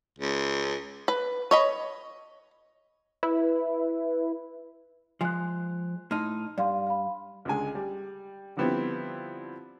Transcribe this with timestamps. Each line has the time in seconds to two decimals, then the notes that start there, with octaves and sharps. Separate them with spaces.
0.19 C#2
1.08 B4
1.51 C#5 D#5 B5
3.23 E4 B4
5.21 F3 G#3 G#5 F#6
6.11 A2 D#4 A5 C6 F6
6.58 G2 D5 F5 C6
6.87 F5 B5
7.45 C#2 D3 G#3 G#5
7.75 G3
8.57 D3 F3 G3 B3 C4 E4